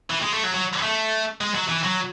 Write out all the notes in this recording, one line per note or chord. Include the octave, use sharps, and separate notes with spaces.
E3
G#3
A3
F#3
F#3
A3
G#3
F#3
E3
F#3